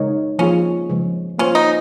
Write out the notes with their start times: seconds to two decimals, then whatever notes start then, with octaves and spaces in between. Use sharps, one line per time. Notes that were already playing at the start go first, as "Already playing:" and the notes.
Already playing: C#3 G#3 D#4 A#4 C#5
0.39 F3 A#3 C#4 F4 G#4
0.89 C#3 F3 G#3
1.38 A#3 C#4 F4 C5
1.55 D#4